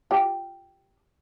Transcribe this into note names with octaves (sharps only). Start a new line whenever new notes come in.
F4 G4